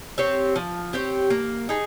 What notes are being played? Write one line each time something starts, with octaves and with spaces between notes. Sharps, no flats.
C4 G4 C#5
F3
C4 G4 C#5
A#3
D#4 G#4